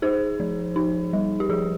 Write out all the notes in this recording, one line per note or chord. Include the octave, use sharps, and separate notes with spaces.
D#4 G#4 C5
F3
D#4
G3
G4
F3 G#4